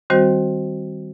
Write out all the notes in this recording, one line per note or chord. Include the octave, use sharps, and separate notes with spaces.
D#3 G3 C4 F#4 C5